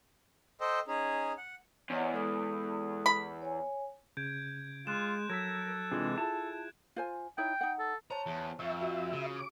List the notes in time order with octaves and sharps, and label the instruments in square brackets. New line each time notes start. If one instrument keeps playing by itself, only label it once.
[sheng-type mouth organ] A4 C5 D#5 G5
C#4 D#4 G#4
F#5
[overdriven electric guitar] E2 [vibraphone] C#5 D#5 F#5
[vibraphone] G#3 A4 D#6
[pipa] B5
[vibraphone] C#5 G#5
[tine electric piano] C#3 [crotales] G6 G#6 D7
[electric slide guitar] G#3 [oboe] F4 [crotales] F#6 E7
[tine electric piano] F#3 E6 B6 [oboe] A4 [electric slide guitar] A#4 [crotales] G#6
[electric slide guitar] C3 E3 G#3 [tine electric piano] D4 F4 G#4
[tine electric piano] E4 F4 G#4 [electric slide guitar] A5
[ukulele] F4 C5 G#5
[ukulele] D#4 E4 C#5 [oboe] G5
[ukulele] D#4 F#5
[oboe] A4
[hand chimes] C5 C#5 A5 [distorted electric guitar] A#5
[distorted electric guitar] E2
[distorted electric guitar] F2 [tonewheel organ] E5 [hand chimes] C#6
[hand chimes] F4 F#4
[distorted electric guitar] C#3
[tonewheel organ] D6